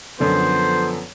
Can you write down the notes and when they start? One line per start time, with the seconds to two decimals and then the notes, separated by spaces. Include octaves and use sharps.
0.20 F#2 D3 F3 B3 A4 C5